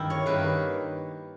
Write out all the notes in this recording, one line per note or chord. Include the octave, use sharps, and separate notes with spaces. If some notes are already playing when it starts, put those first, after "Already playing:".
Already playing: G2 D#3 A#3 E4 G4
C#5
G2 D#3 A#3 B4